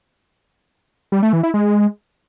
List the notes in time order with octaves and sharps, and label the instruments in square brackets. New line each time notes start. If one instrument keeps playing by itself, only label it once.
[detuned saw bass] G3
A3
E3
E4
G#3